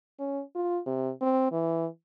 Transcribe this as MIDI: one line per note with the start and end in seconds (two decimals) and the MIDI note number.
0.20 0.42 61
0.55 0.80 65
0.87 1.11 48
1.21 1.48 60
1.52 1.87 52